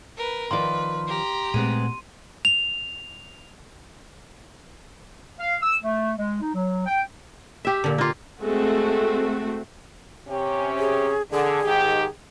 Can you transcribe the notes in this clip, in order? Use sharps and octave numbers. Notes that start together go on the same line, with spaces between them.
A#4 B4
D#3 F3 B4 D5 C6
G4 A#5
A#2 G#3 A3 B3 C4 D#7
F7
F5
E6
A3
G#3
D#4
F#3
G5
G4 E5
A#2 D3
A#3 F4
G#3 A3 C4 F#4 A4
C3 C#4 G4
G#4
D3 G#4
G#2 D#3 G4